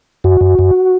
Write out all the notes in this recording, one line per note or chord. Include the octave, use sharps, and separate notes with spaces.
F#2 F#4
F#2
F#2